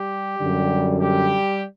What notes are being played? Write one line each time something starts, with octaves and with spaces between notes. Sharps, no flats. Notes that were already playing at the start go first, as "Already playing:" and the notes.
Already playing: G3 G4
F#2 D3 G3
G3 G4